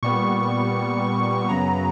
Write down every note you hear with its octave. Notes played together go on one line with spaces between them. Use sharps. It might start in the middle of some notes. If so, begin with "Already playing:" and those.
A#2 G3 B3 C#6
F#2 C#3 F#3 B3 A#5